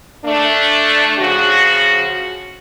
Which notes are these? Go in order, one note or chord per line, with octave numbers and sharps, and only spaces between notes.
A3 D4
C#3 F3 F#4